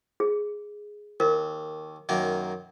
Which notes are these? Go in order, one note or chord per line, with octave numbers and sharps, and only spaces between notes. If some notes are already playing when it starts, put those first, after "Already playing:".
G#4
D#2 A#4
F#2 D#3 A#3